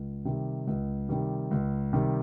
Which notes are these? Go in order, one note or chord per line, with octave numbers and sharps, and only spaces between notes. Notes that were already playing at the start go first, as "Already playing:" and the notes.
Already playing: C#2
C3 D#3 G3
C#2
C3 D#3 G3
C#2
C3 D#3 G3